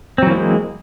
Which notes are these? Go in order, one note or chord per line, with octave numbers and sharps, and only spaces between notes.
E3 F#3 G#3 A#3 C4